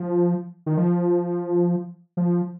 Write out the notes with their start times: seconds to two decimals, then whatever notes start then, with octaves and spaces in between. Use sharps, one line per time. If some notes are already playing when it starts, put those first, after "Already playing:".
Already playing: F3
0.66 D#3
0.77 F3
2.17 F3